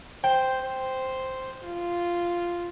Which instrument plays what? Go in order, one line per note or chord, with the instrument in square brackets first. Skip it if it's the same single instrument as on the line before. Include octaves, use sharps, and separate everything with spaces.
[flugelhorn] C5 [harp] G5
[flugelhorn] C5
F4